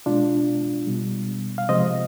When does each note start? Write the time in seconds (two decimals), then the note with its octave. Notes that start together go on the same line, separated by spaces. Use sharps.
0.06 B2 G#3 D4 F4
0.87 B2 G3
1.58 F5
1.69 C3 F3 G#3 C5 D#5